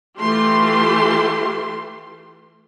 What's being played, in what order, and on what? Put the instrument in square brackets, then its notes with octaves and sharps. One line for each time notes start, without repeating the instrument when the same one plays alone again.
[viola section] E3 A3 F4 G4 C6